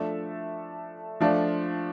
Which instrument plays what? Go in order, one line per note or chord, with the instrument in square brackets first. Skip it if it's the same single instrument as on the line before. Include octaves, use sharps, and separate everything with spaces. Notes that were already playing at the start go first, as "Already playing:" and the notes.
Already playing: [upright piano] F3 A3 D4 A4 E5
F3 A3 D4 F4